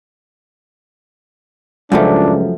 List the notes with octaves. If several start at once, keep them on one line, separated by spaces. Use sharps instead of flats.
C#2 F#2 F3 A3 D4